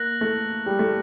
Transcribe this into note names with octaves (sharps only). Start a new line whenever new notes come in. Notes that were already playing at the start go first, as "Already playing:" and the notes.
Already playing: A#3 F#6 A#6 F#7
A3
G3
A3